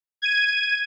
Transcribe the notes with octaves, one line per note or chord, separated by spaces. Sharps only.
G#6 D#7